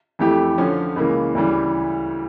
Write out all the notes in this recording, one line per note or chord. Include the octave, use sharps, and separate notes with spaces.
F2 E3 A3 E4 G4
D3 F3 C#4
C#2 C#3 E3 A#3
D2 C#3 E3 G3